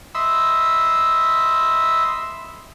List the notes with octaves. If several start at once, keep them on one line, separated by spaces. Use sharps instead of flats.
D#5 E5 B5 C6 E6